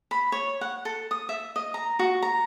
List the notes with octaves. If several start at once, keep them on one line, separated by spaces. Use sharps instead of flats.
B5
C#5
F#5
A4
D#6
E5
D#5
A#5
F#4
A#5